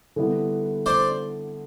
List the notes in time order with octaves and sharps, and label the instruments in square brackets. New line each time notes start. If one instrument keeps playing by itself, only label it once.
[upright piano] D3 G3 B3 E4
[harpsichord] C5 D5